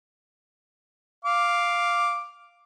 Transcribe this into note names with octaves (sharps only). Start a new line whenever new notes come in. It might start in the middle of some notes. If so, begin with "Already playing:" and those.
F5 D6